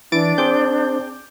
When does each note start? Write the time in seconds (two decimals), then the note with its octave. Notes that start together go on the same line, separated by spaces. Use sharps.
0.12 E3 D4 A6 D7
0.38 C4 G#4 C5 D6 G6